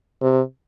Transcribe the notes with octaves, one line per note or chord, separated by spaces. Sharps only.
C3